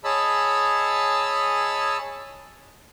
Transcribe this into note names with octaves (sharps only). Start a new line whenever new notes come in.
G#4 C#5 D#5 A5 B5 E6